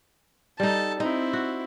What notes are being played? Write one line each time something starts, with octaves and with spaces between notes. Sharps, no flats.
G3 D#4 A4 A5
C4 D#4 E4
F#4